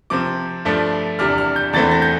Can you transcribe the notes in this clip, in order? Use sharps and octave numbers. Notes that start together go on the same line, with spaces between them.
C3 F3 C4 D6
G2 F3 A3 D4
E2 C3 G3 D4 F6
F6
G6
E2 E3 A3 C4 A6
A#6
G6